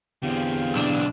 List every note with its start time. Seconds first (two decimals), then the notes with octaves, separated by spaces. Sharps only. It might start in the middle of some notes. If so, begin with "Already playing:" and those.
0.23 E2 D3 C4 G4 G#4 F5
0.76 B1 D4